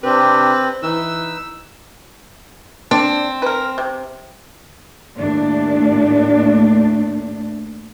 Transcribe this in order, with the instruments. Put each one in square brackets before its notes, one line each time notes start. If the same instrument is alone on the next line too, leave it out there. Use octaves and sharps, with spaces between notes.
[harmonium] C3 D4 G4 [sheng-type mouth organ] C4 [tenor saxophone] B4
[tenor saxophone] E3 [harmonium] D#4 B4 [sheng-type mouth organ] E6
[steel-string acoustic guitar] C4 [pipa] D4
[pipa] A#4 B4
C3
[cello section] D#2 A2 A3 D4